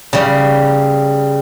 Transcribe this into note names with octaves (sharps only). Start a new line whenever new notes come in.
C#3 G3